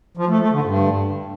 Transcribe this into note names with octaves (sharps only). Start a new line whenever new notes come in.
F3
A3
A3
D3
G2